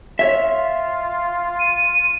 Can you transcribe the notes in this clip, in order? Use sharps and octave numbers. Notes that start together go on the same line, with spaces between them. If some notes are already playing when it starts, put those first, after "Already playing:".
F4 C#5 E5
D#7